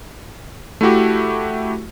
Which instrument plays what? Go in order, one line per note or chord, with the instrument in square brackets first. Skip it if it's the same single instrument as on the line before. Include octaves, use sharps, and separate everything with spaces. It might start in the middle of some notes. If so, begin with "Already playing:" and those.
[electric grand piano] A3 E4 F#4 G4